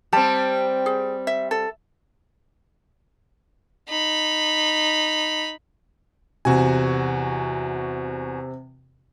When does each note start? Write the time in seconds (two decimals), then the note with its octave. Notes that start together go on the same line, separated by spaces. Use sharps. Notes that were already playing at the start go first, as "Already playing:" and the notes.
0.13 G3 C4 G4 A5
0.86 G#4
1.27 E5
1.51 A4
3.88 D#4 B5
6.45 E2 C3 F#4 G#5